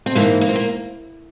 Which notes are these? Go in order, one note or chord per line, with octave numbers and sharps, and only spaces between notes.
C4
G#2 E3 A#3
A#3
C4
A#3